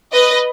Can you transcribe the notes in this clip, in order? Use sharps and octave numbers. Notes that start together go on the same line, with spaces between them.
B4 D#5